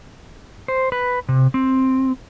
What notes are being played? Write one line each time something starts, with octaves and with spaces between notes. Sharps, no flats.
C5
B4
C3
C4